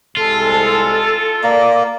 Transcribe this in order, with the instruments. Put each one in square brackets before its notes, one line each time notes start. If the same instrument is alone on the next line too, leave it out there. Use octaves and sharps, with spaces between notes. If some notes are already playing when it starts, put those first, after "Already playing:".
[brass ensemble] C2 G#3 [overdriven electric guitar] F4 [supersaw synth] A4
[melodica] A#3 [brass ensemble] D5